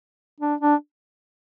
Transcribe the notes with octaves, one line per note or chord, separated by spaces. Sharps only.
D4
D4